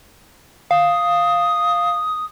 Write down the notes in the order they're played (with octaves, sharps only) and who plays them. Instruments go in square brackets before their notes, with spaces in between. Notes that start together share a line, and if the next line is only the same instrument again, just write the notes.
[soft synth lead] F5 [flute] D#6